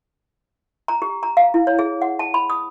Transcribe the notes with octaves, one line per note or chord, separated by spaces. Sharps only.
A#5
G4
A#5
F5
E4
C#5
G#4
F#5
A5
B5
D#6